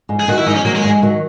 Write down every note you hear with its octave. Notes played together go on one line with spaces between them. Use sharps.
G#2
G#4
D#3 F#3 F#4
E4
G#2 D#4
C#4
D#3 F#3 A#3
G#3
G#2
D#3 F#3